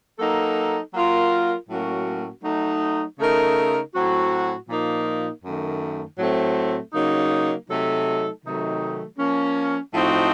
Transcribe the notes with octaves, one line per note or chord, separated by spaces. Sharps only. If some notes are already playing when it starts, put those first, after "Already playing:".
F#3 A#3 D#4 A4
F#3 A#3 F4 A#4
A2 F#3 A#3 C#4 F#4
F#3 A3 D#4
C#3 A3 D#4 A#4
A2 F#3 C4 F#4
A#2 F3 A#3 D#4
F#2 D#3 A3
A2 F#3 A3 C4
C#3 F#3 A#3 D#4
C3 F#3 A3 D#4 A4
C3 D#3 F#3 A3 D#4
F3 A#3 C#4
A2 F3 C4 D#4 F#4